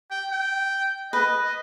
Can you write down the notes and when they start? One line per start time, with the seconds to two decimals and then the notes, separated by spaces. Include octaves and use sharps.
0.11 G5
0.31 G5
1.13 B4 D#5
1.43 D#5